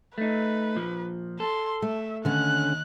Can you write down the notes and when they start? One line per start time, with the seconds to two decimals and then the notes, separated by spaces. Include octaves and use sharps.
0.18 A3 D#4 B4
0.75 A#2 F3
1.40 A4 C6
1.82 A3 E5
2.25 D#2 D3 C#4 F#6